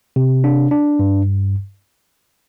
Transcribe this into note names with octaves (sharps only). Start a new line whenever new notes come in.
C3
D4
D4
G2